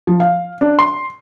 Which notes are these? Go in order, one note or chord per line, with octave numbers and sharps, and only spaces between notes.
F3
F5
D4
C6